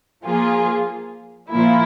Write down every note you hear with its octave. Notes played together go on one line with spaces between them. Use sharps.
F3 A#3 F4 G#4
A#2 F3 A#3 E4